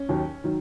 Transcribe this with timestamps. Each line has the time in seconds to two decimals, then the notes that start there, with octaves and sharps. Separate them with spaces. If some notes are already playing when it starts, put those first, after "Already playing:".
Already playing: C#4
0.09 D#2 D#3 F#3
0.44 D#3 F#3